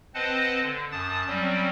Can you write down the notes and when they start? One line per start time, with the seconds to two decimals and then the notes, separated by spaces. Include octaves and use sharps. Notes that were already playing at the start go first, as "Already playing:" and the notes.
0.14 C4 B4 C5 D#5 F#5 A5
0.62 D3
0.92 F#2 A5 D#6 A6
1.28 F#3 G3 C4 C#4